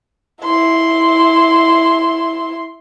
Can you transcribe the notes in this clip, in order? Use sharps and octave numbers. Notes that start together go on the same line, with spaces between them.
E4 C6